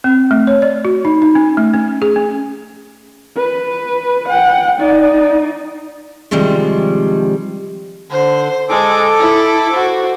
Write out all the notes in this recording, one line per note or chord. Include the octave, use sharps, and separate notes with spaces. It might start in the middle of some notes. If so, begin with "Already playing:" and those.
C4
A3
C#5
D5
F#4
D#4
D#4
C#4
A3
C#4
G#4
C#4
B4
F#5 G5
D#4 D5
C3 D#3 F3 G3 G#3
D3 C5
G#3 A4 D6
E4
F#4 C5